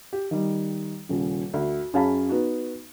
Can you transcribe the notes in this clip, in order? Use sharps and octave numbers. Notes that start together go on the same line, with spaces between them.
G4
D#3 G3
D#1 C#3
D2
F#2 C#4 G#4 F5 A5 B5
B3 D#4 F#4